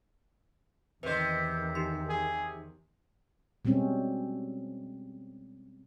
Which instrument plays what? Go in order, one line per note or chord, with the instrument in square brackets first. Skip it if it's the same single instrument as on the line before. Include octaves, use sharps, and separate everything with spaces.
[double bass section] E2 D#3 [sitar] C3 C5 [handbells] B4 D#5
[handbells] D#4 G4 C6
[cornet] G#4
[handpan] B2 G3 G#3 C4 C#4